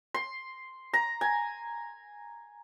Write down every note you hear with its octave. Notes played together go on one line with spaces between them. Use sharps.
C6
A#5
G#5